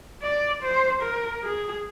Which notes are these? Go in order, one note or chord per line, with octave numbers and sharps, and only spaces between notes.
D5
C5
A#4
G#4